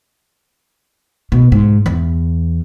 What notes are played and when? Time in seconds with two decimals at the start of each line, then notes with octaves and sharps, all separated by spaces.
1.32 B2
1.52 G#2
1.86 E2